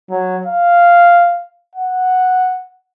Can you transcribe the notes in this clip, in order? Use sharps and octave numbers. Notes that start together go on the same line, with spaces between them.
F#3
F5
F#5